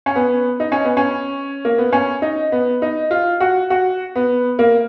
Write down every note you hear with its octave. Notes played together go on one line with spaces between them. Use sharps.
C#4
B3
D#4
C#4
B3
C#4
A#3
B3
C#4
D#4
B3
D#4
F4
F#4
F#4
B3
A#3